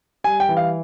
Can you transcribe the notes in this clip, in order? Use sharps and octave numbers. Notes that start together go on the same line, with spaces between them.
G3 G#5
G5
E3
F5